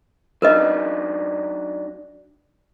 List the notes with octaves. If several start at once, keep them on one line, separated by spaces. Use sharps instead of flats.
F#3 D4 D#4 A#4 B4 D#5